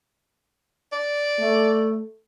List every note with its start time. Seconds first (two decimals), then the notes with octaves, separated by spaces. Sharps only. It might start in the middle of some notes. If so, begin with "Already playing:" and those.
0.92 D5
1.39 A3